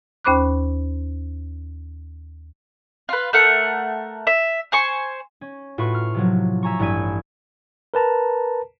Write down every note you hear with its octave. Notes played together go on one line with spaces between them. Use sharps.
D#2 C#4 C5 B5 D6 F#6
F4 B4
A3 A#4 F#5
E5
C5 G#5 C#6
C#4
A2 F4 F#4 B4 C#6
F6
C3 F3 F#3
E5 G#5 A#5 C#6
A1 G2 E4 E5 G#5 D#7
A#4 B4 A5 A#5